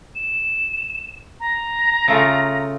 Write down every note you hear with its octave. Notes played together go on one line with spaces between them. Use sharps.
E7
A#5
C#3 A3 F4